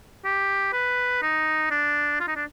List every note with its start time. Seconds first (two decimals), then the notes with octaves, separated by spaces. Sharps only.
0.25 G4
0.73 B4
1.22 D#4
1.71 D4
2.20 F4
2.28 D#4
2.36 D4